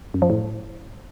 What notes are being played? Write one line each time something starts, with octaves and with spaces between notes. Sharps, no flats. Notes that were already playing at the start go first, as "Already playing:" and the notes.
F#2
F3
A2